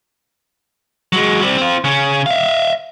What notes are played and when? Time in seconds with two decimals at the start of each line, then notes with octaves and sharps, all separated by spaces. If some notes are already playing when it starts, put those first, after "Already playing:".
1.12 F#3 G#3
1.41 G3 C4
1.57 C4 F4
1.84 C#3 C#4
2.26 E5 F5